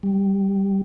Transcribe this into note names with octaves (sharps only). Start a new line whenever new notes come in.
G3